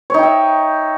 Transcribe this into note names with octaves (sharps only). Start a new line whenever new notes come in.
D#4 C#5 E5 G5